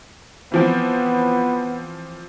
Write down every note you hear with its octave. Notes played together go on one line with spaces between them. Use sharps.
E3 F3 B3 C4